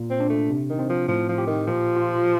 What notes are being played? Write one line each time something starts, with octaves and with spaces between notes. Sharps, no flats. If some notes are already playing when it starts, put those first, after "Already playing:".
Already playing: A#2
C4
D4
A3
C3
D#3
C4
F3
A2 F3
F3
G4
D#3
A#2 F3
F4